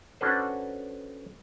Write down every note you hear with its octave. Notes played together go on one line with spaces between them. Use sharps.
C#4 D4 F#4 A4 B4 C5